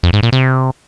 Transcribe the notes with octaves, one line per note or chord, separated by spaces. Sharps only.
F2
G#2
A#2
C3